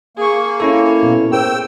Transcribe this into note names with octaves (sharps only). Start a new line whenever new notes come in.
A#3 G#4 C#6
C#4 E4 A4 C#5
B2
G#4 A#4 C5 G5 E6